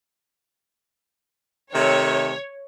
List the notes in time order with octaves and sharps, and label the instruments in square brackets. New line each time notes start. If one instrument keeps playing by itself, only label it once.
[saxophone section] C3 D#3 A3 [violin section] C#5